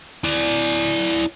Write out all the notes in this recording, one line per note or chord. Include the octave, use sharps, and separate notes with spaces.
E4 D5